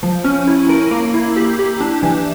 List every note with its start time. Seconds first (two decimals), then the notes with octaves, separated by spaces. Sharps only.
0.03 F3
0.24 C#4
0.48 E4
0.69 A#4
0.91 A#3
1.14 E4
1.37 G4
1.59 G4
1.81 D4
2.03 E3